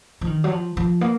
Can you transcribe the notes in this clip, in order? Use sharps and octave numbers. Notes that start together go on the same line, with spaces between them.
F3
D#3
F#3
F3
F3
A#3